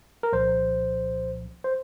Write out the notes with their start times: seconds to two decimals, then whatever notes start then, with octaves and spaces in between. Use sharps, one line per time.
0.23 A#4
0.33 C2 A#2 F3 C5
1.64 C5